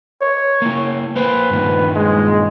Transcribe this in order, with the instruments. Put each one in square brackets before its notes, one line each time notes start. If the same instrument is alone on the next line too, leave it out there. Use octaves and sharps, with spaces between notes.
[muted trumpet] C#5
[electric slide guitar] A#3 E4
[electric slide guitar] A#3 C5 [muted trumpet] B4
[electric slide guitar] G2 A#2 D#3
[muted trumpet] G#3